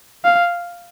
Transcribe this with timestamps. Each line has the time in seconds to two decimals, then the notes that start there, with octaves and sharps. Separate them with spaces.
0.24 F5